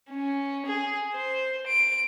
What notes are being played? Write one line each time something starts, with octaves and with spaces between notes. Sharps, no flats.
C#4
G#4
C5
D7